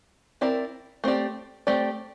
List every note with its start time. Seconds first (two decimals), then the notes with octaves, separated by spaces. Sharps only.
0.41 C4 E4 A#4 D5
1.04 A3 C4 G4 D5
1.67 A3 C4 G4 D5